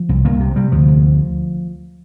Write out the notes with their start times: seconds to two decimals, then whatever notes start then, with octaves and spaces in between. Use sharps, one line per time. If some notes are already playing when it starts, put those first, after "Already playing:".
Already playing: F3
0.09 C2
0.25 C2 A#3
0.40 C3
0.56 C3 G3
0.72 D2 F3
0.88 D2